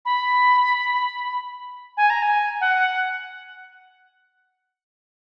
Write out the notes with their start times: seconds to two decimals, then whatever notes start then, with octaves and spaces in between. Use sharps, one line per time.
0.05 B5
1.97 G#5
2.10 A#5
2.22 G#5
2.61 F#5